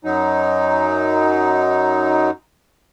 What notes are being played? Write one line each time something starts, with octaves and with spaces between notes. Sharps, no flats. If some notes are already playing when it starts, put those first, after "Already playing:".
F#2 F#3 D#4